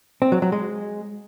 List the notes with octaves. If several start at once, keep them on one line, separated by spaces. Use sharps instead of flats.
C4
F#3
F#3
G#3